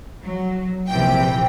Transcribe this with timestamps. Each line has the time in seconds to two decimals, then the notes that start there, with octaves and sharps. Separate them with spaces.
0.22 F#3
0.89 A#1 C3 E3 G5